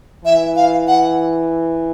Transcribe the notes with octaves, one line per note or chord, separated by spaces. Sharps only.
E3 E5
F5
F#5